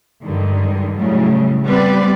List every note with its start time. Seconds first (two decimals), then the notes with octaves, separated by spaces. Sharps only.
0.24 G2 D3 D#3 G#3
0.96 A2 C#3 F#3 G3
1.67 G3 B3 C4 B4 D5